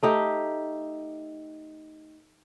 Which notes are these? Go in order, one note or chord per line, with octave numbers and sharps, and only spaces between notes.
A3 D#4 G4